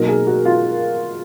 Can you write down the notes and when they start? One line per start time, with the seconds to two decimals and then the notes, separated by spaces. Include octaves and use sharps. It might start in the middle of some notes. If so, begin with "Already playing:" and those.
Already playing: B2 F#3 A#3 D#4 A#4
0.08 G#4
0.27 F#4
0.45 F4